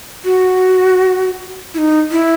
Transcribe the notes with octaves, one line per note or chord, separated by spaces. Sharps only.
F#4
E4
D#4
E4